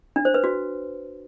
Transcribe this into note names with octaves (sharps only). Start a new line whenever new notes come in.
D4
C5
B4
F#4